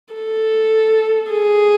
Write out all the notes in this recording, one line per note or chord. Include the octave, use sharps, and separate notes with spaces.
A4
G#4